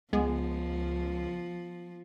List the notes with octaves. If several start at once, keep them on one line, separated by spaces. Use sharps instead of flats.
C#2 F3 G#3 B3